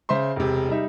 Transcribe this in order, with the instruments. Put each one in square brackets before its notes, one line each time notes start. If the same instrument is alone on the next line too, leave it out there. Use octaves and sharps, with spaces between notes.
[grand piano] C#3 C5 E5 C6
E1 C3
G3 D#4 E5